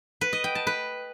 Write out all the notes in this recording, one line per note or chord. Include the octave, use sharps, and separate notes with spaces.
B4
D#5
G5
A5
B4